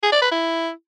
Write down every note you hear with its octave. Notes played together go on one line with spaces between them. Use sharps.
G#4
D5
B4
E4